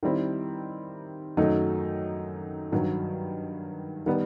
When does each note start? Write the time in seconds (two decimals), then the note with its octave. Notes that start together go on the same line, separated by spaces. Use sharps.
0.03 D#3 G3 C4 E4
1.37 F#2 D#3 F#3 A3 D#4
2.72 G2 D#3 F#3
4.06 D#3 G3 B3